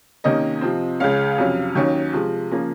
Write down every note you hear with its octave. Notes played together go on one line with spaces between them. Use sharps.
C3 D#3 A#3 C#4 D#5
C3 F3 C4
C#2 C#3 G#3 C#4 F5
F2 C3 F#3 C#4
D#2 D#3 F#3 C#4
C3 F3 G#3
C#3 F3 A#3 C#4